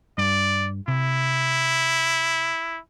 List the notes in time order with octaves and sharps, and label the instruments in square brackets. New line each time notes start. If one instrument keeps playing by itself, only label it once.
[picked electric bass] G2 [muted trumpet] D5
[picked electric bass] C3 [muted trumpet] E4